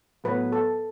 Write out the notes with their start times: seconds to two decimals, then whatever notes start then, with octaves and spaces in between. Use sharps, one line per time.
0.24 A2 F#3 B3 B4
0.52 A4